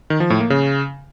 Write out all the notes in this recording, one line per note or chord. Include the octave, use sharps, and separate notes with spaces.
D#3
F3
A2
A#3
C#3